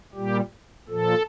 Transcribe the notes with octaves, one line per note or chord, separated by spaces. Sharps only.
A#2 G3 G4
A#2 F3 A4